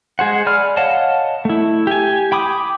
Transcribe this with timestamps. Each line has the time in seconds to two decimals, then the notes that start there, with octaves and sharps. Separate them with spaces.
0.19 G#3 G#4 C5 F#5
0.47 D5 G#5 B5 F6
0.77 C#5 D#5 F5 F#5 A5
1.45 A3 E4
1.87 G4 G#5
2.32 G5 B5 D6 D#6